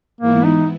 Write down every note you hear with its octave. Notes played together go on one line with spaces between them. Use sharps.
G#2 E3 A#3 B3 E4
D#4